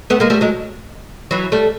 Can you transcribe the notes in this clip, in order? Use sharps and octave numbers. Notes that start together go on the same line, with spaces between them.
A3 B3
G#3 A#3
G3 A3
F#3 G#3
E3 F#3
G3 A3